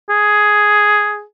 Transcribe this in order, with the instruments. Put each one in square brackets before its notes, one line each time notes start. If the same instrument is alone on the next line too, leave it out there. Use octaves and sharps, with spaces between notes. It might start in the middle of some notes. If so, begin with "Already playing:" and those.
[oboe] G#4